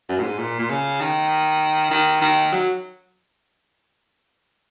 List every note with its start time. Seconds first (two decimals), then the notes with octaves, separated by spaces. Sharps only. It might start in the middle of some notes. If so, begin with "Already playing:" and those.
0.09 F#2
0.20 A#2
0.24 G#2
0.39 A#2
0.59 A#2
0.70 C#3
1.01 D#3
1.91 D#3
2.22 D#3
2.52 F#3